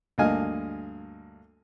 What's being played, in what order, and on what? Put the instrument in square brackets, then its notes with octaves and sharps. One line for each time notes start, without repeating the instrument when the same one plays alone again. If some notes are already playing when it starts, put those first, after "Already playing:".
[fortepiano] D2 G2 A#3 D#5 G#5 F6